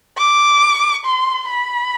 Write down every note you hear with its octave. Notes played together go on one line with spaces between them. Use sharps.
D6
C6
B5